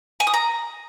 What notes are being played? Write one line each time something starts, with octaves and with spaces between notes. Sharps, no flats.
G#5
D#6
A#5